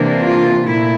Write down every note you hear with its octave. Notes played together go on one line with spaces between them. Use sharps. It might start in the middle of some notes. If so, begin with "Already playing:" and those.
Already playing: C3 E3 A#3 D4
F4
A#2 A3 E4